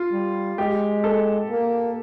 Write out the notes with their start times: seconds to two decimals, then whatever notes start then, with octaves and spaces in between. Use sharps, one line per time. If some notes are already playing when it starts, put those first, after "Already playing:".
Already playing: F4
0.12 G3
0.58 G#3 G4
1.04 A4
1.50 A#3